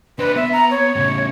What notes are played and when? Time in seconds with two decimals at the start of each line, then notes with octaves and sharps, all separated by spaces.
0.19 D4 B4 C5
0.36 B3 E5
0.53 A#5
0.71 C#5
0.96 A2 C#3